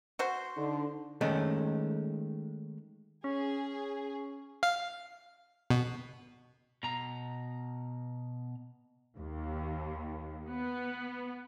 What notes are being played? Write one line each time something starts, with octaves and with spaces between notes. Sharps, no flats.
F#4 C5
D3 D#4
D#3 G#3 A3 C#4
C#4 G#4
F5
B2
B2 A#5
D#2
B3